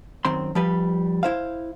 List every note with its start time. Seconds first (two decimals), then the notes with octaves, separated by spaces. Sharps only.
0.25 F#2 D#3 C4 C6
0.55 F3 G3 B4
1.23 E4 C5 F5